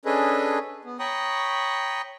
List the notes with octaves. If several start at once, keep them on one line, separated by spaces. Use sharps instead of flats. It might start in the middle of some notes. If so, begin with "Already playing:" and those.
C#4 D4 G#4 A4 B4 D#5
B3
C#5 G5 A#5 B5 C#6 D#6